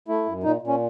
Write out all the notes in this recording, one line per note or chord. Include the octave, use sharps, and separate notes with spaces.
A3 E4
F#2
A#2 D#4
A#2
C#4